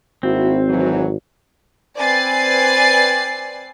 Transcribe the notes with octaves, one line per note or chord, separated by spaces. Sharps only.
G#1 A#3 C4 E4 F#4
F2 E3 F#3
C4 B4 D5 G#5 A6 C7